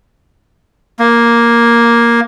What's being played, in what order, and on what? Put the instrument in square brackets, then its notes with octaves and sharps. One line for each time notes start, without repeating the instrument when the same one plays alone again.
[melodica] A#3